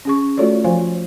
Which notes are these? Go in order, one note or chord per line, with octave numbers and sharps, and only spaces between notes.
C#4 G#4 C#6
A3 F4 F#4 A4 C#5 D5
F3 F4 C5 F5 G#5